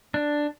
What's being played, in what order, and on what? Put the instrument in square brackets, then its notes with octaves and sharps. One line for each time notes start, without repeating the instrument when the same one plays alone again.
[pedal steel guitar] D4